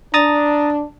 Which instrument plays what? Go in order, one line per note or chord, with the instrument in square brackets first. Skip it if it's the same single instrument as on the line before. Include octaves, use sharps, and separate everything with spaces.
[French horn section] D4 [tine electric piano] A#5 D#6 A6